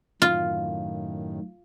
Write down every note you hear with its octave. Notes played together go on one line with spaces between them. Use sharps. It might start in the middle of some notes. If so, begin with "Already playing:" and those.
F#2 A2 D#3 F4